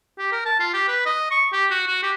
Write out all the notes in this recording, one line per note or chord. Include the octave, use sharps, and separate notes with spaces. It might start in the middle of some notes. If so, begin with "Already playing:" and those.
G4
A#4
A5
F4
G4
B4
D#5
C#6
G4
F#4
F#4
G4